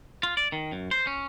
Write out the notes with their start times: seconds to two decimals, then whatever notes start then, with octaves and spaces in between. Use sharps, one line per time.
0.23 F4
0.37 D5
0.52 D#3
0.72 F#2
0.91 C5
1.07 C#4